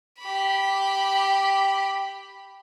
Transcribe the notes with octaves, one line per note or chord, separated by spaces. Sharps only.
G4 B5